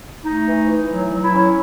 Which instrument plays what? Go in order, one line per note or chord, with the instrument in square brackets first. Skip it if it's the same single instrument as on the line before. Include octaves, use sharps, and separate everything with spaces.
[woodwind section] A3 D#4
E3
E3
F#3
F#3
E4
C#4